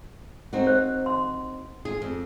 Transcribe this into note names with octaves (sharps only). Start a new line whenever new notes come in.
C4 D#4 F#4
C5
C6
F4 G#4
F2